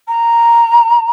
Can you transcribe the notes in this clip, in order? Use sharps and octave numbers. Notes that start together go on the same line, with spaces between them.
A#5